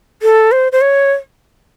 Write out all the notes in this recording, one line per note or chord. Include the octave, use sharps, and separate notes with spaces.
A4
C5
C5
C#5